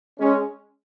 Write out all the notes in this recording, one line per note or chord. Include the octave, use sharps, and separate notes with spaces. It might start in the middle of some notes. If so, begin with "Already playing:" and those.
G#3 C#4